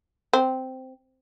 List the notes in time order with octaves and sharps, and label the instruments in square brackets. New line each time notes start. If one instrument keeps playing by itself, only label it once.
[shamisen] C4